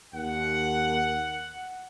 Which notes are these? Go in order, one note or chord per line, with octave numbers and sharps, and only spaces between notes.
D#2 F#5